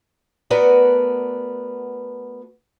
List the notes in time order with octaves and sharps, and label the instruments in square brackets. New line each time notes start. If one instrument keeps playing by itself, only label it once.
[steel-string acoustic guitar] A3 B3 F#4 A#4 B4 D5